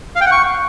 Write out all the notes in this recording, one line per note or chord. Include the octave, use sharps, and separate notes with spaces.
F5
G5
F#5
C#6